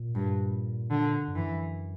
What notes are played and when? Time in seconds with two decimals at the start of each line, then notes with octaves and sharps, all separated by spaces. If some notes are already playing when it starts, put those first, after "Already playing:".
Already playing: A#2
0.15 G2
0.90 D3
1.28 G2
1.35 F#2 E3